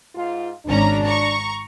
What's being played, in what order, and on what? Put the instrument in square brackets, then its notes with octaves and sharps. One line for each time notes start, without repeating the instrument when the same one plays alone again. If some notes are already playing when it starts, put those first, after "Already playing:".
[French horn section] G#2 F4
[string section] G#1 C#4 A#5 [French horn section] D4
[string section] A#5 C#6